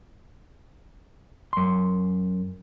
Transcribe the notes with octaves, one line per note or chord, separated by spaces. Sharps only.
F#2 C6